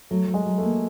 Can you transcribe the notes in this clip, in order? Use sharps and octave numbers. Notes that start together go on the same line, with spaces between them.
F#3 A3
F#3
G#3
F#3
A3
A#3